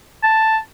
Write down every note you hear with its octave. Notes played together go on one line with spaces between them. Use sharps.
A5